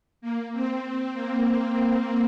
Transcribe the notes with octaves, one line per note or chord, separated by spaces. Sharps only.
A#3
C4
C4
A#3
A#3